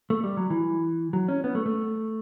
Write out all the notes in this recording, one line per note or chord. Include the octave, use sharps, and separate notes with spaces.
A3
G3
F#3
E3
F#3
C#4
B3
A3
A3